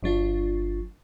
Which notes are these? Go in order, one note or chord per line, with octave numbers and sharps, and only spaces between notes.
G1 F#3 D4 F4